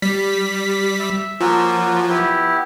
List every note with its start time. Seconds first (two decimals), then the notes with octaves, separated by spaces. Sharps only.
0.02 G3 B6
0.99 E5
1.41 F3 A#3 C#4 F#4
2.09 B3 E4 G4